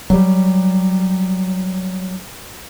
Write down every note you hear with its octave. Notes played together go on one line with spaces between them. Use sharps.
F#3 G3